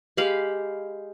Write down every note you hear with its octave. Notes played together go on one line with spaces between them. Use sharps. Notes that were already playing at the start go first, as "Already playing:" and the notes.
G#3 G4 F5 B5